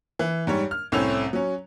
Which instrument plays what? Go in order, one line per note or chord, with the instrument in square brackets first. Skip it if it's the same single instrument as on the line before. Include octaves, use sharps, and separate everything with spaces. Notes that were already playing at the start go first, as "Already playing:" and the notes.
[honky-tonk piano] E3
G#2 G3 C#5
F6
C2 A2 C4 C#4 E6 F7
F#3 C#4